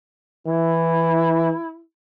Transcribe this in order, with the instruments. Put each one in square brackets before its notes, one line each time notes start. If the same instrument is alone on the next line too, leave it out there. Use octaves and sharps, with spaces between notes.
[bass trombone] E3 [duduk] E4